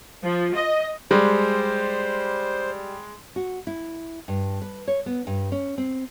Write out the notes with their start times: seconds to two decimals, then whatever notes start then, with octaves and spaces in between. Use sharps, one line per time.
0.23 F3
0.54 D#5
1.11 G3 G#3 C5
3.36 F#4
3.67 E4
4.28 G2
4.62 B4
4.88 C#5
5.06 B3
5.27 G2
5.52 C#4
5.78 C4